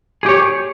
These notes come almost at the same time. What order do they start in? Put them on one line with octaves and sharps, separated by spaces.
G#4 G4 C#5